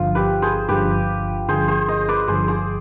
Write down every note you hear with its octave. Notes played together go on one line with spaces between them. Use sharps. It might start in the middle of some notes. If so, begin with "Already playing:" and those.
Already playing: G1 G2 D3 F3 F4
G4 B4
G#4 C5
G1 G2 D3 F3 G4 B4
G1 G2 D3 F3 G#4 C5
G#4 C5
C5 D#5
B4 D5
G1 G2 D3 F3 G#4 C5
G#4 C5